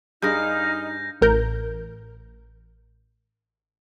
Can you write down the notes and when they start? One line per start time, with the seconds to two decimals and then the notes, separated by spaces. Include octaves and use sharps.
0.22 G2 D#4 G#4 A#4 F5 G6 A#6
1.21 A1 A#4 G6